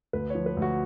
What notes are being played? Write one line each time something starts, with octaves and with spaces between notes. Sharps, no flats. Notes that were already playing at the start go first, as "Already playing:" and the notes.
D2 B4
F3 C#5
B4
D2
F#4